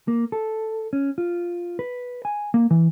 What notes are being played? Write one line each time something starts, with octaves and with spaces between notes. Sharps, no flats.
A#3
A4
C#4
F4
B4
G#5
A#3
E3